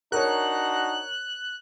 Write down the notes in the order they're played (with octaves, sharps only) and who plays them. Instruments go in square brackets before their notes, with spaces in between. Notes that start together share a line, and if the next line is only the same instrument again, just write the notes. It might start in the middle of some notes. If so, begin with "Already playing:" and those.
[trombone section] D4 D#4 F#4 [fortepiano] A#4 C#5 [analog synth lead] F#6